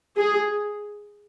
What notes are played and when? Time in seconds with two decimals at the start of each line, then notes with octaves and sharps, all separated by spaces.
0.17 G#4